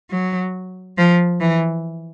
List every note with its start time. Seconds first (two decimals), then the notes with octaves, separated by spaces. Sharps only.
0.10 F#3
0.98 F3
1.41 E3